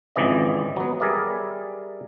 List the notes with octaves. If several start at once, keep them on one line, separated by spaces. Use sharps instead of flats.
G#1 F2 C#3 E3 D5 D#5
F#3 B3
G3 G#4 A#4 D5 E5